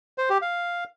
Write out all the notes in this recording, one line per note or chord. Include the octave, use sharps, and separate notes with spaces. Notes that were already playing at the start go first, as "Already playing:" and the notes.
C5
G4
F5